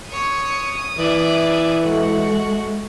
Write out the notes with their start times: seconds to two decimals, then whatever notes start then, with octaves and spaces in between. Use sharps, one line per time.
0.11 C#5 D#6
0.98 E3 D5 E5
1.83 G#3 A3 F#4